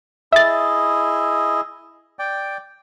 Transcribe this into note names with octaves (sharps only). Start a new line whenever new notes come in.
E4 G#4 D#5 E5 A6
D5 G5